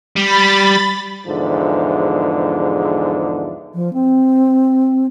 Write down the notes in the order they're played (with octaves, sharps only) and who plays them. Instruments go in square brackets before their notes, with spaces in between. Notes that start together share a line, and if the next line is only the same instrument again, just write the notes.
[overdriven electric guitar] G3 [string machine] B5 A6
[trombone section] E2 G#2 D3 F3
[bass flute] F3
C4